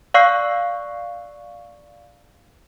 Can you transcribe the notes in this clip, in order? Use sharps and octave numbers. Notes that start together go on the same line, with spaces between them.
D5 F5 C#6 E6 F#6 C7